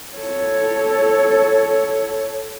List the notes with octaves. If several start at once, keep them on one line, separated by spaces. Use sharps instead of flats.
A4 C#5